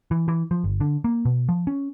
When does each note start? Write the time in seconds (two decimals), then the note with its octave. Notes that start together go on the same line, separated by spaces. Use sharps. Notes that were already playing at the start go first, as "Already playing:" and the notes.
0.11 E3
0.28 E3
0.51 F3
0.64 G1
0.80 D3
1.04 A#3
1.25 B2
1.49 F3
1.67 C#4